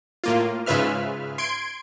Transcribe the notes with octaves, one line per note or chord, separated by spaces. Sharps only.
A2 A#3 F4
G#2 C#3 F4 B4 E5 F6
C6 G#6 D7